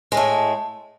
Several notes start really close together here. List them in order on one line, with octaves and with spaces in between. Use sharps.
G#3 A2 A3